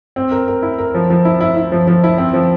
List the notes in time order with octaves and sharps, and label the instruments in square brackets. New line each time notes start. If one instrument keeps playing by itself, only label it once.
[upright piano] C4
A#4
A#4
E4
A#4
F3
F3
E4
E4
E4
F3
F3
E4
C4
F3